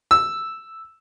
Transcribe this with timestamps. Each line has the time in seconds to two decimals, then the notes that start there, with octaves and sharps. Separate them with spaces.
0.11 E6